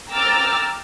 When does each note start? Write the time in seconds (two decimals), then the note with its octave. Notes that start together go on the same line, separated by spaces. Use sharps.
0.11 G5 A#5 D6 E6 F6 A6